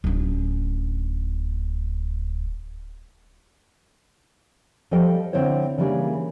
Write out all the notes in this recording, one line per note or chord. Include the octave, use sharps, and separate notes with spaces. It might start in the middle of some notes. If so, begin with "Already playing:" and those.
D1 C#4
F3 G3 A4 D#5 G5
D3 C4 E4 C5 C#5
C#3 E3 G3 A#3 D4 G#4